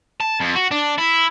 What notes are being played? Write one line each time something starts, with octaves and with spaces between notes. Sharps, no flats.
A5
F2
F#4
D4
E4